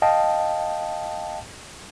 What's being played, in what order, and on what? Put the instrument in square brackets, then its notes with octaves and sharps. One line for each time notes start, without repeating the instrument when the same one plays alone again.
[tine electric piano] D#5 F5 G5 A5